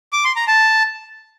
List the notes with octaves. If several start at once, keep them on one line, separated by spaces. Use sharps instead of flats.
D6
C6
A#5
A5